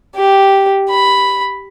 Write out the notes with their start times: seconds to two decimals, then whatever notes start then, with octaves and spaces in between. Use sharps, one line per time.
0.16 G4
0.90 B5